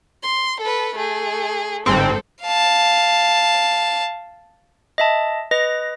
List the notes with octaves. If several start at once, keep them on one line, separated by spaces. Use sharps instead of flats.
C6
A4 B4
A3 G#4
G1 G#2 C4 A4
F5 A5
D#5 E5 A5
B4 D#5 A#6